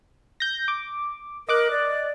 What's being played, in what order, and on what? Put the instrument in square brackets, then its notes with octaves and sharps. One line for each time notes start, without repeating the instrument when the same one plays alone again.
[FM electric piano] G6 A#6
D6
[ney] A#4 [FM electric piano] D#5 D6 F#6
[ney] D5